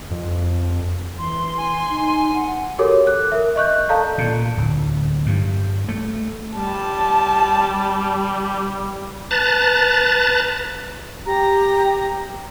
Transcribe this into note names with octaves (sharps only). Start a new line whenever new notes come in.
F2
E3 C6
G#5
D#4
F#5
F#4 G4 A4 A#4 C#5 D6
F#6
A#4 E5
D#5 C#6 F#6 G6
A4 D5 F5 A5 A#5 G6
A#2
D1
G2
A3
G3 A5
B4 A5 A#5 F#6 A6
G4 A#5